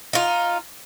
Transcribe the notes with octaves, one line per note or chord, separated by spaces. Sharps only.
D#4 F4